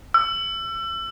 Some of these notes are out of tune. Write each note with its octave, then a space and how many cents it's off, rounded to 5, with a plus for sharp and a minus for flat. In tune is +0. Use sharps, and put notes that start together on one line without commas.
E6 +35